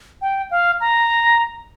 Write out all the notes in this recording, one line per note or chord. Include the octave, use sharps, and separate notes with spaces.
G5
F5
A#5